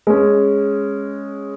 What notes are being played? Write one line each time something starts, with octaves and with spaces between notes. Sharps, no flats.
G#3 C#4